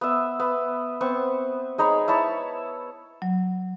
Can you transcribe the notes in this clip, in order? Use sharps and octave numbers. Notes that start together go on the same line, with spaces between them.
B3 E5
B3
B3 C4 C#6
G#3 D#4 C#5 B5
E4 C#5 A5 B5
F#3